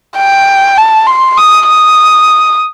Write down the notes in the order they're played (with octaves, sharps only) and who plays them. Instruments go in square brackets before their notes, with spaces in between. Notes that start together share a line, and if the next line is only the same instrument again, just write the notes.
[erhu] G5
A5
C6
D#6
D#6